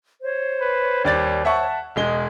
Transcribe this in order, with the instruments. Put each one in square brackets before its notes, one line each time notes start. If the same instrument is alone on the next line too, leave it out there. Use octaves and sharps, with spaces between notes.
[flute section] C5 C#5
[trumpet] B4
[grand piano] D#2 D5 A6 [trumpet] G3
[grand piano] E5 F#5 C#6 [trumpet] A5
[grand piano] E1 G#3 G7 [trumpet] D#5